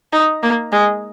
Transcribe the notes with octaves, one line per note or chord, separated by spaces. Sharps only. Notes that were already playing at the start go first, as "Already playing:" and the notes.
D#4
A#3
G#3